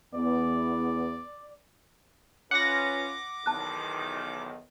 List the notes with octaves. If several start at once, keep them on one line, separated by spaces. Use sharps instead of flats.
E2 B3 D5
C#4 F4 B4 F#5 D6 A#6
B1 E2 D#3 A5 F#6